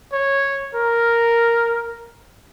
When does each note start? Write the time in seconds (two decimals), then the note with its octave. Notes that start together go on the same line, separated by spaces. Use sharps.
0.13 C#5
0.75 A#4